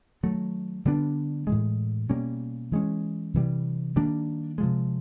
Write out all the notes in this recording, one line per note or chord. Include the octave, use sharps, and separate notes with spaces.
D#3 F#3 A3
D3 G3 B3 D4
A2 E3 G#3
B2 G3 A#3 C#4
E3 G#3 C#4
C3 E3 G3
D#3 G3 A#3 D4
C3 F3 G#3